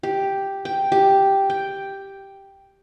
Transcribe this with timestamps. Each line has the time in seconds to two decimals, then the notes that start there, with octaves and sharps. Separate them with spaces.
0.03 G4
0.65 G5
0.92 G4
1.50 G5